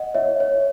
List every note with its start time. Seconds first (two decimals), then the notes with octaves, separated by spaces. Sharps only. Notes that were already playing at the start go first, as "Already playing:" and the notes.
Already playing: D#5 F#5
0.14 C#5 E5
0.40 C#5